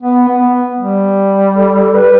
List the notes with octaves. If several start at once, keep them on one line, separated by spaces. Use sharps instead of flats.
B3
B3
G3
A4
B4